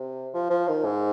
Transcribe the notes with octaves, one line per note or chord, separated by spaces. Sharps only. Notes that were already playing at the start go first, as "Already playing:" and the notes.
Already playing: C3
F3
F3
D#3
G#2